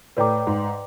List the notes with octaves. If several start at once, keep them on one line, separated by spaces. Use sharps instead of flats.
A2 B4 D5 G5 A#5 D6
G#2